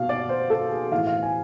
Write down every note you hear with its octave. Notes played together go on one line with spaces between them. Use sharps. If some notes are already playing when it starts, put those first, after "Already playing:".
Already playing: B2 F5
D5
C5
A4
G#4
A2 E3 F5
F5
G#5